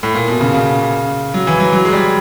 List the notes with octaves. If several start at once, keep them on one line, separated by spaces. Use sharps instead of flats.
A2
A#2
B2
C#3
C#3
F#3
E3
F#3
F#3
G#3
G3